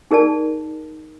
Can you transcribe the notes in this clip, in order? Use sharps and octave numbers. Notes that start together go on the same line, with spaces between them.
D#4 G#4 A#4 D5 A5